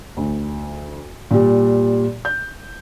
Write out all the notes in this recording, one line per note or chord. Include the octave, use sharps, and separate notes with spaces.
D2
A#2 G3
G6